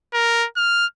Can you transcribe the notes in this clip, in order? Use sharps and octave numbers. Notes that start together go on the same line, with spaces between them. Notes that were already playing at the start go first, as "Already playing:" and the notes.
A#4
F6